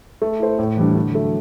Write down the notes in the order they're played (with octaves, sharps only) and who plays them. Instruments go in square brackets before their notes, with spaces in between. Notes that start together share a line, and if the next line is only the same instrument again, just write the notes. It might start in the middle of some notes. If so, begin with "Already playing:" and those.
[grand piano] A3
E4 A4 C5
A2
E3 G3 D4
D3
F#3 A3